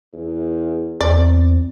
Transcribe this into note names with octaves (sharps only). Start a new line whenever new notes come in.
E2
E2 C4 D5